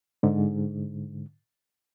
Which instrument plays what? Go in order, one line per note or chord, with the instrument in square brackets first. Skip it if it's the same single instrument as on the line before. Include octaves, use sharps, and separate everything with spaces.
[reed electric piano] G#2 D3